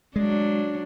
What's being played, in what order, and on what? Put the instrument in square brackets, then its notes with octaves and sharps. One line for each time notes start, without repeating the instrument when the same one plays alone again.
[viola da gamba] F#3 D4 [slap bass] G#3